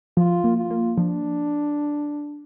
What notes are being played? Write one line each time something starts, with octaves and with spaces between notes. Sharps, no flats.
F3 F4
A#3
F4
A#3
F3 D4